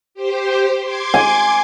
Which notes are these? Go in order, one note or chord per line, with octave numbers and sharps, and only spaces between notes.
G4 C5
C6 D6 G#6
G#5